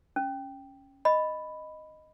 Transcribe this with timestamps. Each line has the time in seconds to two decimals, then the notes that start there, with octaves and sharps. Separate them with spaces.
0.16 C#4
1.05 D#5 B5